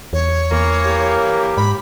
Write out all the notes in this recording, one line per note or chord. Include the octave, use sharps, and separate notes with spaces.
E2 C#5
E2 E3 A#3
G4
G#2 B5